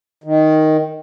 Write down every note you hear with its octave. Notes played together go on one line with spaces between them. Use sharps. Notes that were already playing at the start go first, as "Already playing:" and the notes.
D#3